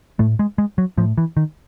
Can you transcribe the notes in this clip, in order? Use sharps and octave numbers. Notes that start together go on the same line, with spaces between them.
A2 A3
G#3
G#3
F#3
A2 F3
E3
D#3